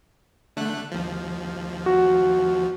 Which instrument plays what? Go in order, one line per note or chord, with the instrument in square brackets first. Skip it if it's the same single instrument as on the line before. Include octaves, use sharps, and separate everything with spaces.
[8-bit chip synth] D3 A3 F#6
D#2 F3
[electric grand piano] F#4